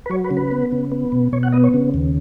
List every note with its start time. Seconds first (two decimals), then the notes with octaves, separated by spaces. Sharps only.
0.06 B4
0.10 F#3 C#5
0.24 B4
0.31 C#3
0.37 B4
0.51 B3
0.72 C#3
0.92 B3
1.12 B2
1.33 B2 C#5
1.43 F#5
1.52 B3 D#5
1.64 C#5
1.74 C#3
1.94 D#2